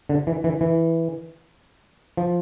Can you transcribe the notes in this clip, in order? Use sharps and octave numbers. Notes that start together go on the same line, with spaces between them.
D3
E3
E3
E3
F3